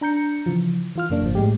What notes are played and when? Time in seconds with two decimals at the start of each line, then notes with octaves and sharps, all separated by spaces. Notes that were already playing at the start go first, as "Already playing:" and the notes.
0.01 D4 A#5 G6 C#7
0.46 C#3 E3 F3
0.96 E3 F4 F6
1.10 F#2 C#3 A#3 D4
1.22 G#1 F3
1.35 A2 G#3 G4